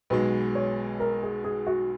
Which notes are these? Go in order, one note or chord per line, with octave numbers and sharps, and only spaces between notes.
B1 B2 G#3 B4
C#5
A#4
G#4
G#4
F#4